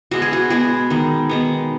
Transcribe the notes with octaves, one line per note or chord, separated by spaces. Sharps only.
B2 G#3 B3 F#4
G#4
F#4
B2 G#3 B3 G#4
D#3 G#3 B3
D#3 G#3 B3